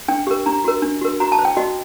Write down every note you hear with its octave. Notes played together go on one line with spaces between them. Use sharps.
D4 G5
G4 A#4
D4 A#5
F#4 A#4
D4
F#4 A#4
F#4 A#5
A5
C5
G5
F#4 D#5